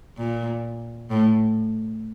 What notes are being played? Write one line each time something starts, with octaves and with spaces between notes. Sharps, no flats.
A#2
A2